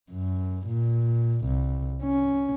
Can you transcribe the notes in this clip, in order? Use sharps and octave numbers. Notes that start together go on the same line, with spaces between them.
F#2
A#2
C2
C#4